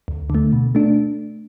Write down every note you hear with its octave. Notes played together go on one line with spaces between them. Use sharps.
D2
D3 A3
B2
A3 D4